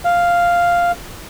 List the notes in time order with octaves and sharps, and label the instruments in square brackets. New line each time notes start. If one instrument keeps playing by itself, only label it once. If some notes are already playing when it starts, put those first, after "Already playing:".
[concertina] F5